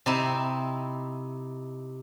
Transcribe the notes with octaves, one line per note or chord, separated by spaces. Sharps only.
C3 D#4 E4